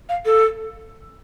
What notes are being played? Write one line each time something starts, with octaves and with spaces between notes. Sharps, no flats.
F5
A4